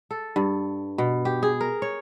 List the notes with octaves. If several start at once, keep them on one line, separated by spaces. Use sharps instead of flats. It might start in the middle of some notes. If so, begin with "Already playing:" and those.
A4
G2
B2
G4
G#4
A#4
C#5